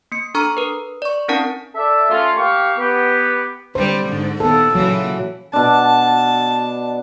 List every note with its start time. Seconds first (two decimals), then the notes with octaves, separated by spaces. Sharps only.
0.12 A#3 C#7
0.35 D4 A4 A#5 C#6 F6
0.57 A#4 B4
1.02 D5 C#6
1.28 C4 C#4 D#4 A#4 F#5 A5
1.75 A4 D5 E5
2.10 A3 C#4 F4
2.36 A#3 G4 F5 C#6
2.78 B3 G4
3.75 D3 G3 C5
4.08 G#2 D3
4.40 A#2 D#3 B3 A4
4.75 A#2 C#3 E3 F#3
5.53 B2 D4 A5